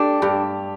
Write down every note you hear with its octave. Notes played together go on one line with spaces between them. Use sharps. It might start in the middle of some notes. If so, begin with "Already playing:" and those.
Already playing: D4 G4 A4
G2 G4